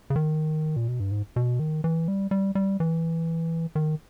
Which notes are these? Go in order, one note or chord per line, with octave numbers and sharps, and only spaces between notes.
C#3
D#3
A#2
B2
G2
G#2
B2
D#3
E3
G3
G3
G3
E3
D#3